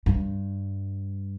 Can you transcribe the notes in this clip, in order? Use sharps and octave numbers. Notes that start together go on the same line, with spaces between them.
G2